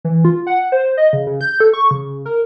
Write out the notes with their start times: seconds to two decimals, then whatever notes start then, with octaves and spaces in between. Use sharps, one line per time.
0.04 E3
0.25 F4
0.47 F#5
0.72 C5
0.97 D#5
1.13 C#3
1.27 C#3
1.41 G6
1.60 A4
1.73 C#6
1.91 C#3
2.26 A#4